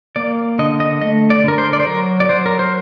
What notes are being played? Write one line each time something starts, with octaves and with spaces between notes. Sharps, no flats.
A#3 D5
D3 D#5
D#5
A3 D#5
D5
D3 A#4
C5
D5
C5
F#3 A#4
D5
F#3 C5
A#4
C5